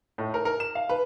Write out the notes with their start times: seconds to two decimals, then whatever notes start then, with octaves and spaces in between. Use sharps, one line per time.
0.18 A2
0.34 A#4
0.45 A#4
0.60 E7
0.75 F5
0.89 B4